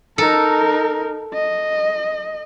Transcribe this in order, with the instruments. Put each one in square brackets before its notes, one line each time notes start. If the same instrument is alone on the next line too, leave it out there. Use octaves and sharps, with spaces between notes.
[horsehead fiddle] D#4 A#4 [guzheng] A4
[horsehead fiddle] D#5